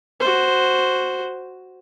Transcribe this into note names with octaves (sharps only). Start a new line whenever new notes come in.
F#4 C5